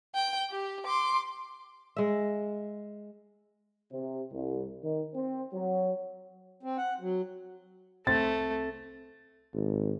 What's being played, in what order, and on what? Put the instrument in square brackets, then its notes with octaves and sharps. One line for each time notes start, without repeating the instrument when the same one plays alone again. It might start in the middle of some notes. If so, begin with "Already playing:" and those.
[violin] G5
G4
C6 D6
[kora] G#3 E5
[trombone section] C3
C2
D#3
C4
F#3
[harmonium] C4
F#5
F#3
[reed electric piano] C2 C4 [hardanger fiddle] A3 [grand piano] A6
[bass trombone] G#1